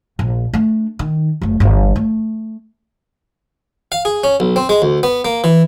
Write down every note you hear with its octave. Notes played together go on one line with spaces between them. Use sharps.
A#1
A3 D4
D#3
F#1 A3
G1 E3
A3
F5
G#4
C#4
B1
C4
G#3
D2
B3
A#3
E3